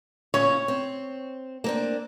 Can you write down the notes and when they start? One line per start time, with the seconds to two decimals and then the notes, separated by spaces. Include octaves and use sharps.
0.34 A#2 C#4 C#5
0.68 C4
1.64 A#3 C4 D4